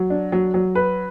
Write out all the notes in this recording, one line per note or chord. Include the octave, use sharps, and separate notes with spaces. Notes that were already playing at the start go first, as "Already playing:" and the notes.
Already playing: F#3
D4
F#3
F#3
B4